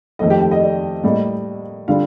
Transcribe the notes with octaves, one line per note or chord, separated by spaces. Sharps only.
F2 D#3 A3 D#5
G4 G5
G4 G5
D#5
D5
A2 G3 A#3 D#5
D3 G3 F4 F5